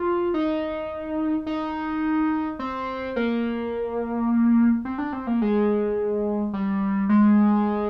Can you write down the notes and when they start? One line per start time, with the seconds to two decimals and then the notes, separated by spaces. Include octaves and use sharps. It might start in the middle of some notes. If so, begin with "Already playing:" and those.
Already playing: F4
0.34 D#4
1.47 D#4
2.59 C4
3.16 A#3
4.85 C4
4.98 D4
5.13 C4
5.27 A#3
5.42 G#3
6.53 G3
7.09 G#3